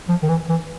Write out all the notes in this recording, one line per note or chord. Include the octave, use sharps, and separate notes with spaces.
F3
D#3
E3
E3